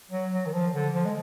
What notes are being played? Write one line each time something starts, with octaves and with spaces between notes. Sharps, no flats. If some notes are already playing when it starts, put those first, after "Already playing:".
F#3
F#3
D#3
F3
D3
F3
G#3